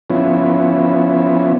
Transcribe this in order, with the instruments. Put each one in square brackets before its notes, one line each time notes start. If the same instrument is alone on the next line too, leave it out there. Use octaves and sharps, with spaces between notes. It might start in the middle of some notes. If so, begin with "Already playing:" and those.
[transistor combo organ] F3 B3 C#4 E4